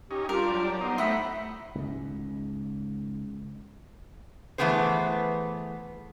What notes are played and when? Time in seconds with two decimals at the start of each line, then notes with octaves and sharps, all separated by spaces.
0.11 C#4 D#4 G4
0.29 G3 D4 F4 A#4
0.51 F#3
0.81 B3 D#4 C5
0.98 A3 E4 F#5 B5
1.75 C#2 G#2
4.58 E3 F3 A3 B3 G#4 C5